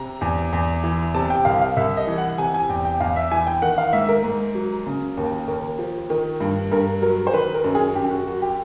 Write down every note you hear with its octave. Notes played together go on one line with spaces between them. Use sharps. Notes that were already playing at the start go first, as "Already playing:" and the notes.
Already playing: C3 A#5
E2
E2
E3
C3 A5
G5
C2 F5
F5
C2 E5
D#5
E3
F#5
C3 G#5
G#5
E2 G5
G5
E2 F5
E5
E3 G#5
G5
D#3 F#5
F5
G#2 E5
A#4
G#2
F#3
C#3
D#2
D#2 A#4
F3
D#3
G2
G2 A#4
F#3 A#4
C5
D#3 B4
A#4
F#2
G#4
F#2 G4
F#4
F#3 F#4
G4